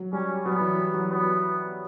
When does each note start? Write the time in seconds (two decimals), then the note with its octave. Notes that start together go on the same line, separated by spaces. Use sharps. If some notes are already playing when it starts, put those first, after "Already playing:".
Already playing: F#3
0.13 G3 C#4
0.45 F#3 B3
0.61 E3
0.94 F#3
1.11 B3